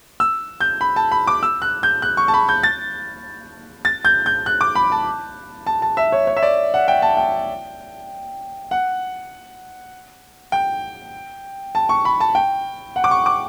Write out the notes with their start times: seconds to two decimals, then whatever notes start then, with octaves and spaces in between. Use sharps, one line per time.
0.20 E6
0.60 G6
0.81 B5
0.96 A5
1.12 B5
1.27 D6
1.43 E6
1.62 F#6
1.83 G6
2.02 F#6
2.17 C#6
2.28 A5
2.34 B5
2.49 G6
2.63 A6
3.85 A6
4.05 G6
4.26 G6
4.46 F#6
4.61 D6
4.75 B5
4.92 A5
5.67 A5
5.82 A5
5.97 E5
6.12 C#5
6.27 C#5
6.37 E5
6.43 D5
6.74 F#5
6.88 G5
7.02 A5
7.17 G5
8.71 F#5
10.52 G5
11.75 A5
11.89 C#6
12.05 B5
12.20 A5
12.35 G5
12.96 F#5
13.04 D6
13.11 C#6
13.26 D6